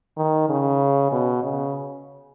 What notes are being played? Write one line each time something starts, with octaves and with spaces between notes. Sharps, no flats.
D#3
C#3
B2
C#3